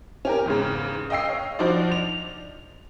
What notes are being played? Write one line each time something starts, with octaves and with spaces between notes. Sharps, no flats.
C#4 G4 A#4
E2 G#2 C#3
D#5 F5 G5 E6 C7
C#5
F3 D4 D#4 F#4 C5 D5
F7